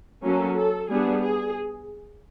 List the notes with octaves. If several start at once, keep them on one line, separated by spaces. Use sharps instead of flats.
F#3 A#3 C#4 A4
A4
G3 B3 D4 G#4
G#4